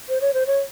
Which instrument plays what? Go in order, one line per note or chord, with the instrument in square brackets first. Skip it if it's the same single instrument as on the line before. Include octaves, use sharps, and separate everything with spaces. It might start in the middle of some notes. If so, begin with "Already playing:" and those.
[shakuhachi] C5
C#5
C5
C#5